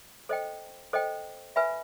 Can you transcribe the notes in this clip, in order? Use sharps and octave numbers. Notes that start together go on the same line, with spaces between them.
A4 C5 D#5 G5
A4 C5 D#5 G5
B4 E5 G#5 B5